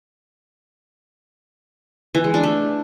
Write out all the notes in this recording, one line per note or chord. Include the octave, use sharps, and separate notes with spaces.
E3
G#3
D4
A3